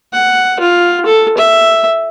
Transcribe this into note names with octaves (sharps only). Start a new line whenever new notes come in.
F#5
F4
A4
E5